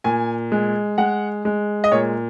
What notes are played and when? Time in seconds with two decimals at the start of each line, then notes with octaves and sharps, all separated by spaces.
0.04 A#2 G#5
0.52 G#3
0.98 G#3 F#5
1.45 G#3
1.84 D#5
1.92 A#2 C#5